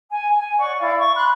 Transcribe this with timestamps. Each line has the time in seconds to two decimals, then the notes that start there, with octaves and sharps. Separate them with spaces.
0.11 G#5
0.37 G#5
0.59 C#5 D5 F#5 C#6
0.79 E4 D5 F5
0.99 C#6
1.16 B5 C6 F#6